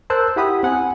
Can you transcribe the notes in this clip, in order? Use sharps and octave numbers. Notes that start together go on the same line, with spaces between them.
A#4 C5 A5 E6 F#6 G6
E4 G4 F#5 B5 D#6
C4 F#5 G#5